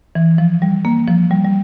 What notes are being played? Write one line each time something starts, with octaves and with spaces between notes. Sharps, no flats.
E3
F3
G3
A#3
F3
G3
G3